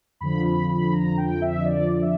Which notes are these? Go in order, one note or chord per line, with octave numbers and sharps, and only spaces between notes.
F2 D3 F3 B5
B5
B5
A#5
G5
E5
D#5
D5
E5